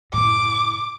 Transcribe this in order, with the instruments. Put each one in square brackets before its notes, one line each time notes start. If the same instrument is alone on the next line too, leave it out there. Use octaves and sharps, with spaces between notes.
[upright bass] F#1 A2 [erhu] D6